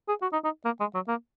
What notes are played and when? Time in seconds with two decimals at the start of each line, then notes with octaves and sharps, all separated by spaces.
0.08 G#4
0.22 F#4
0.33 D#4
0.44 D#4
0.65 A#3
0.80 G#3
0.94 F#3
1.08 A#3